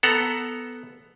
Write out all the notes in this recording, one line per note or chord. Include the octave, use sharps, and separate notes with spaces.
B3 A4 F#5 A#5